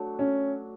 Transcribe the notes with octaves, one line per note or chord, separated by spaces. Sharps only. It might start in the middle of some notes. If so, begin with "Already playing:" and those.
Already playing: F#3 A3 D4 F#4
C#4